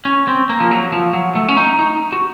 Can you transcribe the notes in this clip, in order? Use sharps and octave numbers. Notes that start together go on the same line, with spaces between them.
C#4
C4
A#3
F3
F#3
F3
F#3
A3
C#4
D#4
D#4
F#4